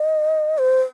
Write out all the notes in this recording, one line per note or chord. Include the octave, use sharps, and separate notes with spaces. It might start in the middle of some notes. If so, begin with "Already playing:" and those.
Already playing: D#5
C5